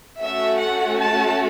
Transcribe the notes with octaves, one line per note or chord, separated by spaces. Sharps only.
A3 C#4 F#4 A4 E5
F#5
A5